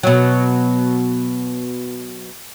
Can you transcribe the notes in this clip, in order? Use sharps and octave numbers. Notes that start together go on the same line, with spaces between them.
B2 F#3